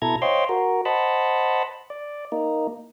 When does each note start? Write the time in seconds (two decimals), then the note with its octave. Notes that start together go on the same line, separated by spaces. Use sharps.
0.02 B2 E4 A4 A#5 G#6
0.22 C5 C#5 D#5 F5 G5 C6
0.49 F#4 A#4
0.85 C5 D#5 F#5 A5 B5
1.90 D5
2.32 A#3 D#4